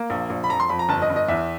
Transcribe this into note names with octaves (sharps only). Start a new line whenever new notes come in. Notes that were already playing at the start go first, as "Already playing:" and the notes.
Already playing: A#3
A#1
A#1
B5
F2 A#5
C6
F2 B5
A#5
G1 A5
D#5
G1
D#5
E2 E5